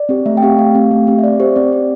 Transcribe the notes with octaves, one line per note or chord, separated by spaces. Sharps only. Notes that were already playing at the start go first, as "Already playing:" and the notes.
Already playing: D5
C4 G4
A3 E5
G5
C4 G4 F5
A3 F5
C4 G4
A3
C4 G4
E5
C4 D5
G4 C5
C4 D5
G4